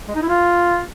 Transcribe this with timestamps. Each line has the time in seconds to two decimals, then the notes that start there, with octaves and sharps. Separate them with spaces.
0.08 G#3
0.15 D#4
0.22 E4
0.29 F4